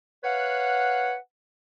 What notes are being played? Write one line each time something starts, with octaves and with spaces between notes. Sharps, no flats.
B4 C#5 F5 F#5